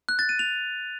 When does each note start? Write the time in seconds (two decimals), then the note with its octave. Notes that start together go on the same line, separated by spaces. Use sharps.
0.09 F#6
0.19 A6
0.29 D#7
0.39 F7